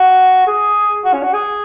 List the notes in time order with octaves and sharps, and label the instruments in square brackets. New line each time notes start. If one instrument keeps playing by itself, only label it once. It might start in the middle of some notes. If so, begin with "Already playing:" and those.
Already playing: [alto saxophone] F#4
G#4
F#4
C#4
F#4
G#4